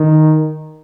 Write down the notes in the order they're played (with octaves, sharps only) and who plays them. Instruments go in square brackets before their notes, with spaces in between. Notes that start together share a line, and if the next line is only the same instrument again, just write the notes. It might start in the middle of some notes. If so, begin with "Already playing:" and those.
Already playing: [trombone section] D#3